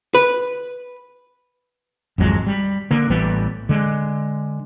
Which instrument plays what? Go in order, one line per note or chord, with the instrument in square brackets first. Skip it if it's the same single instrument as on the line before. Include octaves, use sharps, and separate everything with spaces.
[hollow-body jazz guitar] B4
[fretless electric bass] G#1 F2 F#3 G#3
G3
D3 A#3
A1 E3 G3 B3
D3 G#3